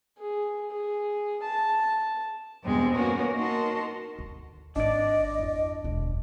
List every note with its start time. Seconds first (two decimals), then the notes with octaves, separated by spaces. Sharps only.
0.19 G#4
0.71 G#4
1.43 A5
2.64 E2 G2 B2 G#3 C4
2.97 A#3 B3 C#4 F#4 A#4
3.35 D#4 F#4 A#4 A5 C6
4.19 D2
4.76 G#1 D4 D5 D#5
5.38 F2 E4
5.84 E1 D2